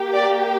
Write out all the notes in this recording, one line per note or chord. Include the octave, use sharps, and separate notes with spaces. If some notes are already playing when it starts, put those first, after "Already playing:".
Already playing: A#3 G4
D5